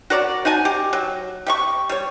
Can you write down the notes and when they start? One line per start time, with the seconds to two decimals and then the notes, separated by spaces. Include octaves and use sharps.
0.10 F#4 A#4 C#5 D5
0.45 D#4 F#4 G#5 A5
0.65 G4
0.93 F#3
1.46 G4 E5 C#6
1.89 G3 C#5